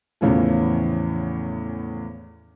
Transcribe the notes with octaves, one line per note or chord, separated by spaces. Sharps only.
E2 A2 C#3 E3 F3